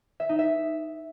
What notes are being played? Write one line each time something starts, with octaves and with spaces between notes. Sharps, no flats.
E5
D#4
E5